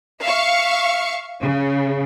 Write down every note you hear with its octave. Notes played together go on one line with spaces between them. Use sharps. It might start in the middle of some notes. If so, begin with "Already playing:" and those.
E5 F5 C#6
C#3